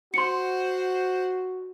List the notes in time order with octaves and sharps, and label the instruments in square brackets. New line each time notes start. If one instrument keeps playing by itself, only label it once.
[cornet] F#4 [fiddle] C5 F#5 [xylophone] C6 C#7